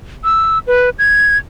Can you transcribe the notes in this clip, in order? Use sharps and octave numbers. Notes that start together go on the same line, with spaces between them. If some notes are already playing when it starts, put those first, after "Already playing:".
E6
B4
G#6